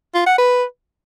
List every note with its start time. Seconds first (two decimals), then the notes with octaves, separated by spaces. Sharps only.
0.14 F4
0.26 F#5
0.38 B4